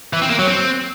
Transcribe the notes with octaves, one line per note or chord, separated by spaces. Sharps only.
E3
C4
A#3
F#3
C4